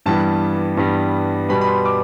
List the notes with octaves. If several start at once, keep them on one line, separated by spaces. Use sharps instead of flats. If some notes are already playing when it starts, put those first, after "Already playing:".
G2 E3 G3 B3 A5
G2 E3 G3 B3
B2 G3 B3 B5
B5
C6
D6